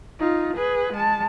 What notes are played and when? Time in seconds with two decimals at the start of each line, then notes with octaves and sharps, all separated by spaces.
0.20 D#4 F4
0.57 G#4 B4
0.93 G#3 A5